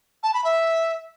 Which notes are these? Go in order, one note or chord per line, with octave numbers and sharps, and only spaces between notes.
A5
B5
E5